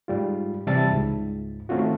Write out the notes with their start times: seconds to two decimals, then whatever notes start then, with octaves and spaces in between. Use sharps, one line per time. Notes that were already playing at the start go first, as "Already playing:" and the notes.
0.08 G#2 G3 F4
0.67 C3 E3 G3 E5 A5 A6
0.91 C#2 G#2
1.69 D#3 A3 C4 C#4 F4 F#4